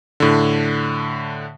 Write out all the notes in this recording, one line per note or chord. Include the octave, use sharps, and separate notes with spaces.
A2 D3